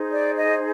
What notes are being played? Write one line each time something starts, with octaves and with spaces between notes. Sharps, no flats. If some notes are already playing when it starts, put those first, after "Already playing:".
Already playing: D#4 G#4 C5
D5
D#5